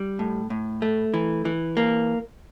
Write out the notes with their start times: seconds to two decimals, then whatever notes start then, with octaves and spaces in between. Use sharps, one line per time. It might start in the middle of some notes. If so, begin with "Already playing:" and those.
Already playing: G3
0.19 A2
0.50 A2
0.82 A3
1.14 E3
1.45 E3
1.77 A#3